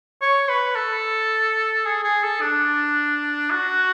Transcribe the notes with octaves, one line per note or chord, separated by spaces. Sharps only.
C#5
B4
A4
G#4
G#4
A4
D4
F#4